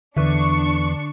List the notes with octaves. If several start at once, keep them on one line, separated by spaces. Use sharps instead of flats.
E2 D3 D4 B4 E5 C#6